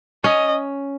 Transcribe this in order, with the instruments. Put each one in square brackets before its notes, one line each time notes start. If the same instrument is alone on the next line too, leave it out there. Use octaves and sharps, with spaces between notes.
[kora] C#4 [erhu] D#5